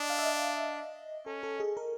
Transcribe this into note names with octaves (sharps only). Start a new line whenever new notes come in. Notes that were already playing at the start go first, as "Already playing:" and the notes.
Already playing: D4 D#5
F5
E5
D#5
C#4 A4
A4
G#4
A#4